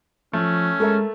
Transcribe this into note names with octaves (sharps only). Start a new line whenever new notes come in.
F3 A3 C#4
G#3 A4 A#4 E5